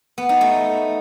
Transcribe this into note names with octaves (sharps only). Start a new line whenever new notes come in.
B3
D#4
A3